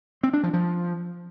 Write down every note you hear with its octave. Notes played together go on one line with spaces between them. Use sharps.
C4
D4
F3
F3